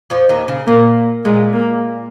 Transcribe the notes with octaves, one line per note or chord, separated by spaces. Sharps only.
F2 F3
D#2 D#3
C#3
A#2 A#3
A#2 G#3
A#3